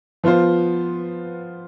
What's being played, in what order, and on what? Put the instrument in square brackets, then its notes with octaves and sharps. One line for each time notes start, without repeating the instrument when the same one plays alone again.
[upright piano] F3 B3 F4 C5